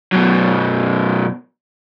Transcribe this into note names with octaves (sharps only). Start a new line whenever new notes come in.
F#2 B2